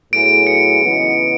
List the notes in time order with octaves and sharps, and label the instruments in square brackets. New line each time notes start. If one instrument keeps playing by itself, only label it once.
[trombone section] A2 F#3 B3 E4 G#4 [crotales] D7
[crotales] C#7
[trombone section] C#3 E3 G#3 B3 D#4